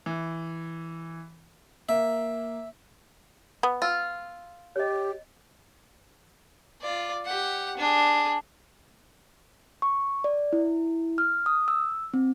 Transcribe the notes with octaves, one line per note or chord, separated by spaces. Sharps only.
E3
A#3 E5
B3
F4 E6
G4 C#5 D#5
F4 D5
G4 F#5
D4 G#4
C#6
D5
E4
F6
D#6
E6
C4